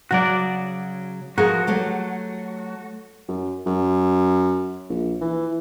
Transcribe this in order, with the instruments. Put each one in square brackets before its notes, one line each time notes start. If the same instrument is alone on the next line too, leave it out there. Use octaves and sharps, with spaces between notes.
[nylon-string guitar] C#3 F#3 [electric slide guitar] F#4 D5
[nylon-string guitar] F3 G#4 A#4 [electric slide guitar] F#4
[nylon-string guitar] F#3 A3 G4
[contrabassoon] F#2
F#2
A#1
E3